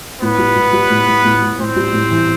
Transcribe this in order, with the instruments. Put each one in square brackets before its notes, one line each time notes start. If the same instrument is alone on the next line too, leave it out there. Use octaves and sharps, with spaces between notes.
[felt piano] A2 [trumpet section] B3 B4
[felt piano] G3
G3
G3
A2
A2
A2
A2
[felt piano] A2 [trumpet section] C4 C5
[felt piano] G3
A2
E3